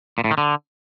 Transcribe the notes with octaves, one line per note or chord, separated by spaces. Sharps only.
A#2
A2
D#3
D3